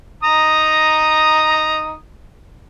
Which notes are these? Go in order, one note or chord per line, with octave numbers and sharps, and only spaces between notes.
D#4 A#5 D#6